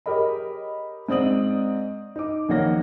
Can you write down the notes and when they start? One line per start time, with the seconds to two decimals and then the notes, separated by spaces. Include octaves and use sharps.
0.06 G4 G#4 A#4 C#5 D#5 B5
1.09 G#2 C4 D5 D#6 F#7
2.16 D#4 D6
2.49 A#1 D#3 A#3 C#5 F#5 A#6